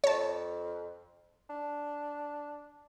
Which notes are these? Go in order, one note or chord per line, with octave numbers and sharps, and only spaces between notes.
F2 C#5 A5
D4